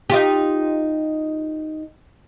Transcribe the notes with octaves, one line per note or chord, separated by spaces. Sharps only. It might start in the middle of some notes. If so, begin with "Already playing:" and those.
D#4 F4 G4